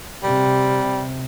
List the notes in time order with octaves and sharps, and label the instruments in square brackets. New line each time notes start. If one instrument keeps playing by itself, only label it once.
[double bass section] C3 [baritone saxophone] G3